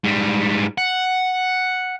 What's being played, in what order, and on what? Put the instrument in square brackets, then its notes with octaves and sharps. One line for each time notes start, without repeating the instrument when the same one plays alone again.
[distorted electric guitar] G#2 G3
F#5